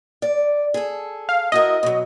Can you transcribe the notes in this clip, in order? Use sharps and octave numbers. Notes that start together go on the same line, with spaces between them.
D5
G#4 A4
F5
E4 F#4 A#4 D#5
B2 F#3